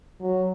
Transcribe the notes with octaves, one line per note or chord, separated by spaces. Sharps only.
F#3